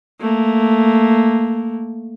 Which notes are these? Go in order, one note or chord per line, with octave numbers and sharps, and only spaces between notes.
A3 A#3